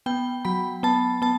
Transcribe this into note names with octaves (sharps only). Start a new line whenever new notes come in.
B3 G5
F#3 B5
B3 A5
B3 A5